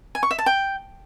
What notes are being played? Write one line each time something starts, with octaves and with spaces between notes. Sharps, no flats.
G#5
C#6
E5
A5
G5